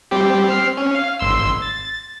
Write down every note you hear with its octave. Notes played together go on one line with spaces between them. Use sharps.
G3 C4 G4
C4 F6 C7
C#4
F5
G#1 C6 E6
A6